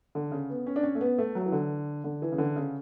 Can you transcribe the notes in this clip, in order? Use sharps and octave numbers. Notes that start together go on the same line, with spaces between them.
D3
C#3
B3
C#4
D4
C#4
A3
B3
A3
F#3
E3
D3
D3
E3
C#3
D3
C#3